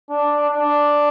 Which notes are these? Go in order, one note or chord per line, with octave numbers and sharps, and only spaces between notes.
D4
D4